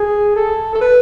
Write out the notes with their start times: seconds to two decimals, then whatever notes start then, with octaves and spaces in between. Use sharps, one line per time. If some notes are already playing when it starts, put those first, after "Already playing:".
Already playing: G#4
0.36 A4
0.75 A4
0.81 B4